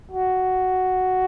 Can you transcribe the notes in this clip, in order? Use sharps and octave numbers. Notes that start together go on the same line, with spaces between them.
F#4